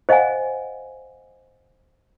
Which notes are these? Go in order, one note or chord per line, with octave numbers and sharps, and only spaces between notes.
C5 D#5 F5 F#5 G#5